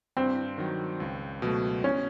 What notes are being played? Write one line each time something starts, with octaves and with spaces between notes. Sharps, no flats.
G2 C4
D#3 F#3
C#2
B2 F#3 A3
B2 C#4